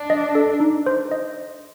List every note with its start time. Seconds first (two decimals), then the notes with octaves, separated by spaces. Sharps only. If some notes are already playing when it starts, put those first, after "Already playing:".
Already playing: D4
0.10 D#5
0.35 A4
0.60 D#4
0.87 C5
1.11 D#5